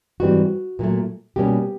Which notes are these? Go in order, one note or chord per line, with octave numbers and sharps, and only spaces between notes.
G#2 E3 G3 C4 F#4
A#2 F#3 A3
B2 G3 A#3 C#4 G4